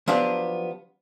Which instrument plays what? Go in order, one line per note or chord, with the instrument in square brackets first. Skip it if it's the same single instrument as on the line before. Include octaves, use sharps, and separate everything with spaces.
[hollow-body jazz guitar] F3 F#3 B3 D4 G4 D5